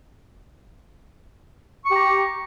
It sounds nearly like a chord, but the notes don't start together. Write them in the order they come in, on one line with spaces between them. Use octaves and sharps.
C#6 G4 A#5